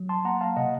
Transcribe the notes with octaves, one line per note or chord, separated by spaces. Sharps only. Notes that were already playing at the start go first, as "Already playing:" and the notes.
Already playing: F#3
A5 C6
A#3 F#5 A#5
F5 A5
C3 D#5 F#5